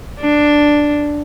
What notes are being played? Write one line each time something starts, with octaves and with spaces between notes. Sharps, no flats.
D4